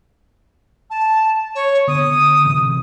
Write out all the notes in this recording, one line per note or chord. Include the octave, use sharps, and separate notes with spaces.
A5
C#5
D3 B3 D#6
A1 C3 E3